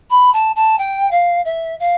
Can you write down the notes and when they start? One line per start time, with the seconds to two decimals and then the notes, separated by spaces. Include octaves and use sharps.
0.10 B5
0.33 A5
0.55 A5
0.78 G5
1.11 F5
1.44 E5
1.79 F5